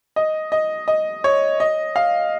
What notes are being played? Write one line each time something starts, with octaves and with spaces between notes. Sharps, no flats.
D#5
D#5
D#5
C#5
D#5
F5